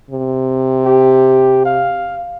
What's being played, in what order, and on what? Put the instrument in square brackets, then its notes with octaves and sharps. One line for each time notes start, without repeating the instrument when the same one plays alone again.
[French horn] C3
[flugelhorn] G4
F5